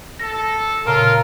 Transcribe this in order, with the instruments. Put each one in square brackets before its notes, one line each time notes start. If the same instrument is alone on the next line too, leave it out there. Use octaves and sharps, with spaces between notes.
[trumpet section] A4 [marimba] A#6
[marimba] A#2 C#3 [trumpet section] F4 [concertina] A#4